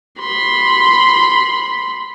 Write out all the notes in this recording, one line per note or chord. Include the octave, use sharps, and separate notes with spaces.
B5 C6